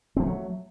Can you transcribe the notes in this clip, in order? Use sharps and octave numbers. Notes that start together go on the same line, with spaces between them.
F3 F#3 A3 C4